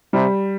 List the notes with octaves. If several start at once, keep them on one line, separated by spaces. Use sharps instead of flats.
C3 G3